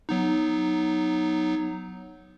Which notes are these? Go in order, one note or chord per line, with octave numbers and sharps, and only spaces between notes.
F#3 B3 D#4